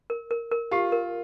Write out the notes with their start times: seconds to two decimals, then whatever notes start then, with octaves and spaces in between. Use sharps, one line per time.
0.10 A#4
0.31 A#4
0.51 A#4
0.71 F4 G4
0.92 A#4